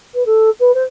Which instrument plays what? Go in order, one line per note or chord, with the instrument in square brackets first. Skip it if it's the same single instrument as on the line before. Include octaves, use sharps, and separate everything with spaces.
[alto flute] B4
A4
B4
C5